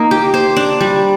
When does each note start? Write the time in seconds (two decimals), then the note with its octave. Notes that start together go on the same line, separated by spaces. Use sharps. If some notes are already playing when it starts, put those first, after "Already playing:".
Already playing: A#3 D#4
0.11 G4
0.34 C5
0.56 D4
0.81 G3